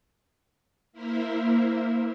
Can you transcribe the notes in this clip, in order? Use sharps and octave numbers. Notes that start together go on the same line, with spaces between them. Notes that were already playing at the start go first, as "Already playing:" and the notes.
A#3 E4 A#4 C5 E5